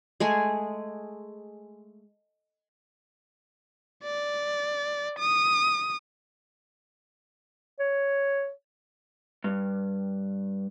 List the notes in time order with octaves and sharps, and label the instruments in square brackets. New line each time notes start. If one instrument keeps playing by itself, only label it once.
[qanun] G#3 A3 G#4 G#5
[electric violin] D5
D#6
[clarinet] C#5
[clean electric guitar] G2